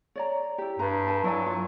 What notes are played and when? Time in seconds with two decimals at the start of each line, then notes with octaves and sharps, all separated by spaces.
0.16 C#5 D5 A#5
0.58 E4 G4
0.79 G2 B4 A#5
1.07 A#4 G#5 A5
1.24 F#3 E4 D5 G#5
1.46 F4